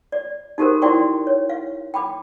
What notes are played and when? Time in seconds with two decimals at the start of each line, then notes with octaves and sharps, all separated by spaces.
0.12 D5
0.58 D#4 F#4 G4 A4 A#4 C5
0.82 E4 F#4 D5 G5 C6 C#6
1.27 C#5
1.49 F5
1.94 G5 B5 D6